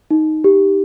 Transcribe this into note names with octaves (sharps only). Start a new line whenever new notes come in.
D#4
G4